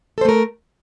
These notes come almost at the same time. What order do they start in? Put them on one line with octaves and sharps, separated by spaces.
A4 C5 A3 A#4